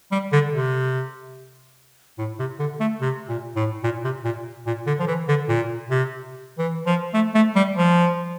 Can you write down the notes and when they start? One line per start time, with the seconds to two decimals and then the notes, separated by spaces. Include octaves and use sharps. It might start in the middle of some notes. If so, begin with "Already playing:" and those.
0.12 G3
0.32 D3
0.53 C3
2.18 A2
2.39 C3
2.59 D3
2.80 A3
3.01 C3
3.29 A#2
3.56 A2
3.84 A#2
4.04 C3
4.25 A#2
4.66 A#2
4.87 D3
5.00 F3
5.07 E3
5.28 D3
5.49 A#2
5.90 C3
6.59 E3
6.86 F3
7.14 A3
7.35 A3
7.56 G3
7.76 F3